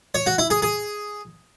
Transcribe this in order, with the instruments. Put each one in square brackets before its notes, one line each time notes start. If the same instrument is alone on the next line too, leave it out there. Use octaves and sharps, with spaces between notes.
[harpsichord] C#5
F#4
E4
G#4
G#4